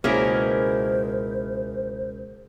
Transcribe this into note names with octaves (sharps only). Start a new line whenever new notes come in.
C#2 B2 A#3 C#4 E4 G#4 A#4 C5